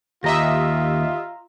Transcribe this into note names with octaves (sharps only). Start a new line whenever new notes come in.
D#2 F4 G4 D#5 E5 A#5 A#6